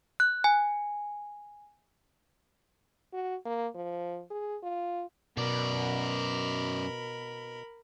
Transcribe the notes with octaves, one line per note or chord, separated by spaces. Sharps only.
F#6
G#5
F#4
A#3
F3
G#4
F4
F#2 B2 A#4 D5 B5